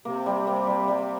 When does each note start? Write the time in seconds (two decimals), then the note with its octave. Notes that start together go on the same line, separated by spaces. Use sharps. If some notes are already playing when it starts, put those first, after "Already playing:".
0.05 C3 A#3
0.26 G3
0.47 A#3
0.67 G3
0.88 G3